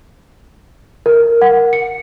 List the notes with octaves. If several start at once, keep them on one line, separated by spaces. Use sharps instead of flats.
A#4
F#5
C#7